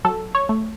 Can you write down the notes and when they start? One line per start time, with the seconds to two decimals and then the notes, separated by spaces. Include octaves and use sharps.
0.04 F#3 A4
0.35 C#5
0.49 A3